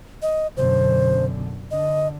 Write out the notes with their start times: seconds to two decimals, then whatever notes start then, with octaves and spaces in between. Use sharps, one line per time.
0.22 D#5
0.57 F#2 B2 D3 C5
1.71 D3 D#5